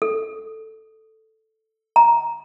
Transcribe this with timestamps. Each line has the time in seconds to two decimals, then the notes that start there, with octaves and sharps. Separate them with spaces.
0.02 A4
1.96 A#5